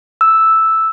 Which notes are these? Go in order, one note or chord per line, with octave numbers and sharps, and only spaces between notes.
E6